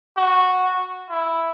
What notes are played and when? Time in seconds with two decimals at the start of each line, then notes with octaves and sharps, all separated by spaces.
0.17 F#4
1.10 E4